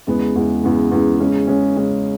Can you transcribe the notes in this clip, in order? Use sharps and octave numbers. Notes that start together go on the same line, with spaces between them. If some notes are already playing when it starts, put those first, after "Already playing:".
E2 C#3 G#3 B3
E2 C#3 G#3 B3
E2 C#3 G#3 B3
E2 C#3 G#3 B3
C#3 G#3 C#4
C#3 G#3 C#4
C#3 G#3 C#4